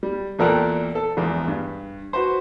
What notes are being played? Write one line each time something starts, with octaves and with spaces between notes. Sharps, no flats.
G3
E2 A#2 A4 A#4 G5 F#6
A4
A#1 E2 G#3
G2
F#4 B4 C5